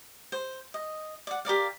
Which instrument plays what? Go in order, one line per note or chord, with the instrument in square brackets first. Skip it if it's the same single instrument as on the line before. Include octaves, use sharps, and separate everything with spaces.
[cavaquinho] C5
D#5
D5 F#5
G4 A#4 D5 F5